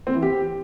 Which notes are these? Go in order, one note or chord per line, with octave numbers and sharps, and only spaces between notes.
C4
E3
G4